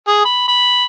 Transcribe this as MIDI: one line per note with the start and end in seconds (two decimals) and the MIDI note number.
0.08 0.21 68
0.25 0.46 83
0.48 0.85 83